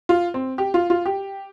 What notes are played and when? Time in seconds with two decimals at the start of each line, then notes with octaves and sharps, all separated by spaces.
0.09 F4
0.34 C4
0.58 G4
0.74 F4
0.90 F4
1.06 G4